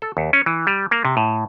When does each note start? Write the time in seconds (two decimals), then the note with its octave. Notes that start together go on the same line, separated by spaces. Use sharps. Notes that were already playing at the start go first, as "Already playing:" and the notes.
0.02 A4
0.17 D#2
0.33 C#4
0.46 E3
0.67 G3
0.91 A#3
1.05 C3
1.17 A2